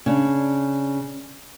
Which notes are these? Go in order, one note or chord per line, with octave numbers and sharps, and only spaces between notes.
C#3 D4